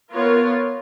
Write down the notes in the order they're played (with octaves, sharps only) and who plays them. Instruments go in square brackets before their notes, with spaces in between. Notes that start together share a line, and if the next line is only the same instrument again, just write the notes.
[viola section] B3 F4 A#4 C#5